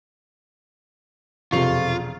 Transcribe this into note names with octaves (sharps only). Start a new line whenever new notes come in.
E1 F2 C3 F4 C#6 C7 F7